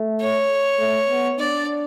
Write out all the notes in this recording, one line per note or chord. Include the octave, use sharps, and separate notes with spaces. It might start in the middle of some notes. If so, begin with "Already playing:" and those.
Already playing: A3
C#5
A3
B3
D4 D5